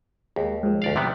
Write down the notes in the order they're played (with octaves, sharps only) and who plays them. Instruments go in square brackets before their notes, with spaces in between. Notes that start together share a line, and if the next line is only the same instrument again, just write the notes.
[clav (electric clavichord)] D#2 [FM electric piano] G#3
[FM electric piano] G#2 F3
[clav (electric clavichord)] D2 D5 F5
C3 G3 B3